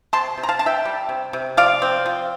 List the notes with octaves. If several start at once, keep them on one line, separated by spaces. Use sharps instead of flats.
C3 A5 C6
C3
A#5
F5 A5
D4 A5
E5 G5
G3
C3
C3
F3 D5 F5
C4
F3